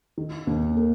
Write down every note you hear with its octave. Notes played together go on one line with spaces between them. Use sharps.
D#3
D#2
A#3